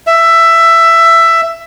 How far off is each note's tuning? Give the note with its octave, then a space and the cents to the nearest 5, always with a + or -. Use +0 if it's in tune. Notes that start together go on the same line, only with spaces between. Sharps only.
E5 +10